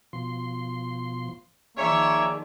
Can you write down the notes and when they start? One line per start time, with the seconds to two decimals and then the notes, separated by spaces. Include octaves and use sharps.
0.13 B2 F3 C6
1.77 D#3 F3 A#3 G#4 C#5 D5 E5